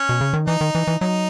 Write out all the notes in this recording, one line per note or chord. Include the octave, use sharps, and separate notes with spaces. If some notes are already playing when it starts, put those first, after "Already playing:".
Already playing: C#4
B2
C#3
D#3
E3 D#4
D#3
E3
E3
F#3 D#4